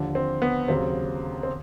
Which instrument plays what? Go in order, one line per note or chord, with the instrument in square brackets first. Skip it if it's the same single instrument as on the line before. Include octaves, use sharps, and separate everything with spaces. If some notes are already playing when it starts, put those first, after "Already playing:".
Already playing: [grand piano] D#2 D3 F3
C4
B3
D#2 C#3 F#3 C4
C4